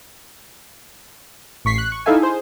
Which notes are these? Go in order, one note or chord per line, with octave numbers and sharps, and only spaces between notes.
A1 C#6 B6 C7
F#6
C#6
D#4 E4 A4 E5 F5 G#5
G#4 C5